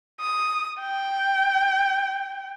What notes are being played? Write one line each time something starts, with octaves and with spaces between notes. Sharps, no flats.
D#6
G5